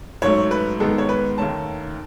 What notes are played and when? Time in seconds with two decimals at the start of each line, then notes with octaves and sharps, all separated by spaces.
0.22 G#2 F#3 A3 C#4 C#5
0.51 B4
0.80 G#2 D#3 G#3 B3 A4
0.98 C#5
1.09 B4
1.38 D#2 D#3 A3 C#4 A5